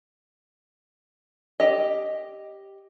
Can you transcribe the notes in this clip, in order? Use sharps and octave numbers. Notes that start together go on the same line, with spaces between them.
G4 D#5